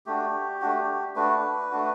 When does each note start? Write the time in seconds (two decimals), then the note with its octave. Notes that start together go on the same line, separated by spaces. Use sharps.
0.06 A3 D4 F#4 G4
0.61 A3 D4 F#4
1.16 A3 D4 F#4 B4
1.71 A3 D4 F#4